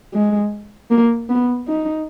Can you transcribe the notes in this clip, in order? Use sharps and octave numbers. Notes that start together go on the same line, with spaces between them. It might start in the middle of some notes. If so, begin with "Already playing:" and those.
G#3
A#3
B3
D#4